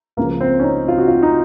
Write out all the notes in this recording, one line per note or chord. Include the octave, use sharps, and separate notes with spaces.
C#2 C#3 F3 A#3
C4
C#4
D#4
F4
F#4
F4
D#4